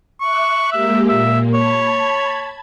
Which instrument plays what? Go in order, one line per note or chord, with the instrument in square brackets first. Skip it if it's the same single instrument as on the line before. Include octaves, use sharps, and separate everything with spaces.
[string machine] E5 D6 F#6 [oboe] C#6
[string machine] G#3 A#3 G4 [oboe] E5
[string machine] A#2 A#3 [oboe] E5
[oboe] C#5 [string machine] A5 B5 G#6